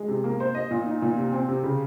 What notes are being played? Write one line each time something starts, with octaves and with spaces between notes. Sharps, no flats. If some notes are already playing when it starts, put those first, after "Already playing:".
Already playing: G#3
C3
A#3
C5
D#5
A#2
D#4
A#2
C3
C4
C3
C#3